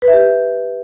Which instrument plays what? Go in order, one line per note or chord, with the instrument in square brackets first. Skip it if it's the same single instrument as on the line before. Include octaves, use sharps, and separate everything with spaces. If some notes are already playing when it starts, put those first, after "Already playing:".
[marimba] B4
E5
G4